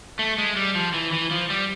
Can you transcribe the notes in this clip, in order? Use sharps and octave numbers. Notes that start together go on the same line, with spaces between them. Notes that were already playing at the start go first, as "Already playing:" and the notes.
A3
G#3
G3
F3
E3
E3
F3
G3